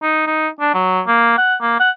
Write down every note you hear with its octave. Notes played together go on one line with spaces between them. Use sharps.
D#4
D#4
D4
F#3
A#3
F#5
A#3
F#5